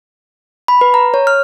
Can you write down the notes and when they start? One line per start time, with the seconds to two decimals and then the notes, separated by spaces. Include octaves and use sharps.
0.68 B5
0.81 B4
0.94 A#5
1.14 C#5
1.27 F6